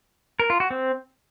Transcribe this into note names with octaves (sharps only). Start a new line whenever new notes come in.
A#4
F4
F#4
C4